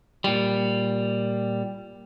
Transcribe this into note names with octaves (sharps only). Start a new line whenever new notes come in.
A#2 G3